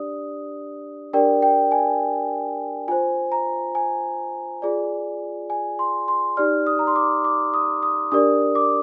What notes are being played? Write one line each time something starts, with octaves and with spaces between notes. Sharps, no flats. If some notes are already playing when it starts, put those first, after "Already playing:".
Already playing: D4 G4 D5 D#6
D4 G4 A#4 D5 G5
G5
G#5
F4 C5 G#5
A#5
G#5
F4 G#4 D5
G#5
C6
C6
D#4 G4 D5 F6
D#6
A#5
C6
D6
D6
D#6
D#6
D4 G4 A#4 D5 D#6
D6